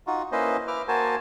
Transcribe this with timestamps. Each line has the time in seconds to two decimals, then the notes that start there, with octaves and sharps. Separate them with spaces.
0.07 D#4 F4 F#4
0.32 A#3 C#4 E4 B4 C5 D#5
0.68 B4 E5 D6 F6
0.88 A#3 F#4 A#4 C5 G#5 A5